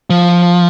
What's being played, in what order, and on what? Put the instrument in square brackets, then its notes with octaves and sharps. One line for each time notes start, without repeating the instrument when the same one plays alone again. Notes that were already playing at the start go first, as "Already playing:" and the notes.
[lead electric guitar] F3